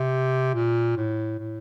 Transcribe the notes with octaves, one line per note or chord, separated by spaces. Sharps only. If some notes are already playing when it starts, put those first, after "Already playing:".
Already playing: C3
A#2
A2
A2